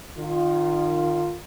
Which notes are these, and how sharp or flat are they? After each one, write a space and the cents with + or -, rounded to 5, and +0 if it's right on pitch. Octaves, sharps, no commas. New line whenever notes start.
D#3 -30 F4 +0